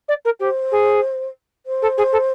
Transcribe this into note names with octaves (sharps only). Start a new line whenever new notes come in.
D5
A#4
G4 C5
G#4
C5
A4
G#4
A4